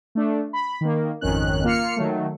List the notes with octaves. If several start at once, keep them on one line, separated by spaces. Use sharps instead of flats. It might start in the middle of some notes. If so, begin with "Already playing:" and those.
A3 D4
B5
D#3 A#3
G#1 F2 D#3 C#4 F#6
A#3 F4 F6 C7 C#7
D#3 F#3 A3